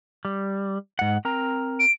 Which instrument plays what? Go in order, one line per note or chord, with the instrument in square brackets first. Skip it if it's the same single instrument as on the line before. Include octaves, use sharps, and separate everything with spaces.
[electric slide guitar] G3
G#2 F#5
C4 A#4 A#5
[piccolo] D7